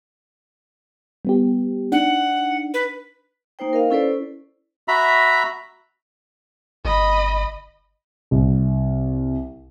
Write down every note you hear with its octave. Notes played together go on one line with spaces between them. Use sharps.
G3 B3 G4
D4 D#4 F#5
B4
A#3 D#4 C5 G5
A#4 D#5 F5
C#4 E4 A4 B4 C5 D5
F#4 E5 A#5 B5
G1 D#5 B5
C2